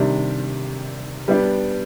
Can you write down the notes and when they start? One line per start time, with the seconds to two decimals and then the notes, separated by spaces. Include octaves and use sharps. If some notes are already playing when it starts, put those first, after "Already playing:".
Already playing: C3 D#3 G3 D4
1.28 G3 B3 D4